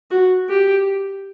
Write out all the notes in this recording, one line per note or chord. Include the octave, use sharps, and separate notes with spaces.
F#4
G4